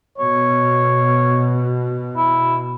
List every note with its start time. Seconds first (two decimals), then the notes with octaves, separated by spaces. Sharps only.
0.18 B2 C#5
2.17 E4